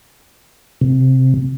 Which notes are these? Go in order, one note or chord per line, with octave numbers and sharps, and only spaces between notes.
C3